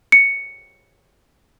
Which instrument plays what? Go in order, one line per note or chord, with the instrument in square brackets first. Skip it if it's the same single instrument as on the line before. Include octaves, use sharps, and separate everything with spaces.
[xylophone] C#7